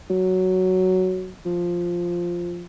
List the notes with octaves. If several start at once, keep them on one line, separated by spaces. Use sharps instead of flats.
F#3
F3